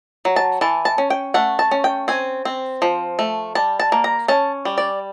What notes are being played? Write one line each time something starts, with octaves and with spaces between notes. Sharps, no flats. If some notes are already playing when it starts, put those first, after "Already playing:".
F#3
A5
E3 A5
A5
C#4
G5
A3 F#5
A5
C#4
G5
C4 G#5
C4
F3
A3
G3 A5
A5
A#3
A#5
C#4 A5
G3
D5